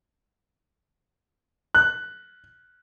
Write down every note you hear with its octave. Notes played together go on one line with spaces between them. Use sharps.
F#6